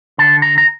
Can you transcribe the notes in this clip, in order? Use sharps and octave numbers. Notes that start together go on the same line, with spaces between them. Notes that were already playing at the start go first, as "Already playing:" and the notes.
D3 A5
A#5
A#5